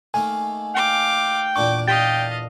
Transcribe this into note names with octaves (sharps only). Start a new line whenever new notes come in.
D#3 A3 A#3 G#5
F5 G5 D6
E2 A#2 D4 C#6 D6
D#5 F5 G5 A6 B6